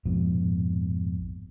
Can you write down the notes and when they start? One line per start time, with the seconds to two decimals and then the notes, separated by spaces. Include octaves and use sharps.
0.05 A#1 F2 G#2 B2